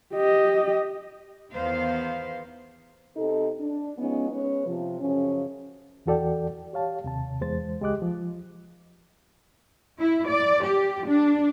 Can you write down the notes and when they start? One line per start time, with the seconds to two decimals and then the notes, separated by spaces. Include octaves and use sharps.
0.14 G4 D#5
1.53 E2 D#3 B3 C5 F5
3.16 C3 C4 D#4 A4
3.60 D4
3.98 F3 G#3 B3 C#4 D#4
4.31 G#3 B3 C#4 B4 C#5
4.65 C3 F3
5.00 F#2 C#3 F3 C#4
6.06 E2 E3 F#4 A4 D5 G5
6.73 G4 C#5 F5 A5
7.04 D#2 C3 A5
7.41 E2 G#3 C5 A6
7.81 C#2 G#3 G4 D#5 D6 F#6
8.02 F3
9.99 E4
10.28 D5
10.65 G4
11.08 D4